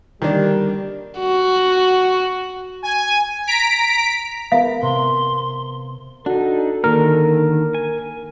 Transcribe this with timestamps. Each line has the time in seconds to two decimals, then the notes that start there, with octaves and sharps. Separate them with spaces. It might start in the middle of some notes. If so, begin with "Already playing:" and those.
0.22 D3 D#3 G3 A#3 D4
1.20 F#4
2.84 G#5
3.47 A#5 B6 D7
4.52 B3 A#4 E5 F5
4.82 C3 C6
6.26 D4 D#4 F#4 A4 F#5
6.84 D3 D#3 A#3 A#4
7.75 G#5